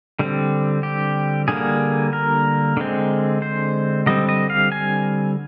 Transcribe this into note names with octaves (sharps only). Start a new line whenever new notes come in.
D3 G3 C4
G4
D3 G3 A#3 G#4
A#4
D3 G#3 C4
C5
D3 G3 C4 D#5
D#5
F5
G#5